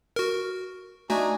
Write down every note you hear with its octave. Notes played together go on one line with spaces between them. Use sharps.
F#4 A#4
A3 D4 D#4 F#4 G#5